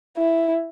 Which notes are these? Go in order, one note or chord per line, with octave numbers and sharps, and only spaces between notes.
E4